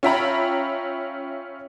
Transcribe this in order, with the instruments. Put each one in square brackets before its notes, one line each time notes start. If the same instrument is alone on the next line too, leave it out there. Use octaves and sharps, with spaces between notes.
[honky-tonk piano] C#4 F4 E5 G5 A#5 B5